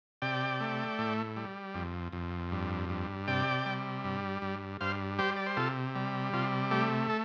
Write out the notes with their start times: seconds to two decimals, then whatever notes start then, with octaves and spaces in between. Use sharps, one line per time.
0.22 C3 D5 G5
0.60 A3
0.99 A2
1.36 G3
1.75 F2
2.12 F2
2.52 G2
2.89 G2
3.28 C3 D5 G5
3.66 G3
4.04 G2
4.42 G2
4.81 G2 C5 F5
5.18 G3 G4 C5
5.36 D5
5.46 C5
5.57 C3 F4 A4
5.95 G3
6.33 C3 F4
6.71 A3 G4
7.10 A4